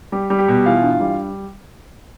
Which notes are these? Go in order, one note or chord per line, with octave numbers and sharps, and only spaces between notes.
G3 G4
G3
G4
B2
E3 F4 F5
G2
G3